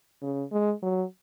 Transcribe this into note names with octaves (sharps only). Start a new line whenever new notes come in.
C#3
G#3
F#3